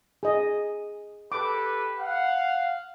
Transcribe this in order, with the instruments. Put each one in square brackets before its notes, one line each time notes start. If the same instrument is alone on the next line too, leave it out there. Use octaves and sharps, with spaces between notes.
[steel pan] G#4 D#5
[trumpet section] G4 A4 B4 [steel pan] D6
[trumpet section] F5 F#5